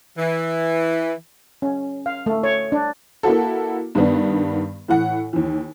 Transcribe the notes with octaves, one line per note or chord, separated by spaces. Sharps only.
E3
C#4
F5
A3
C#5
D4
A#3 E4 F#4 A4
G2 D#3 B3 D4
A2 E3 F#5
D#2 E3